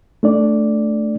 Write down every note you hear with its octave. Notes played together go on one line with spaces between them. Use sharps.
A3 D4 D5